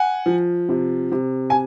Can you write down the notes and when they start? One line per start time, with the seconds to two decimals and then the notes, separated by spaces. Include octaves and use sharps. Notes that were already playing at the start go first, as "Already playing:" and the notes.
Already playing: F#5 G#5
0.26 F3
0.69 C3
1.12 C3
1.50 G#5